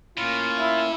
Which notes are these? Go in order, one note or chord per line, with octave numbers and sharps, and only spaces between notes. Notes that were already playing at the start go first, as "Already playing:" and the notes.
A2 A#3 C#4 F4
E4